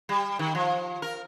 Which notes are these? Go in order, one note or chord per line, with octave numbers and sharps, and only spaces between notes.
G3
D#3
F3
A#4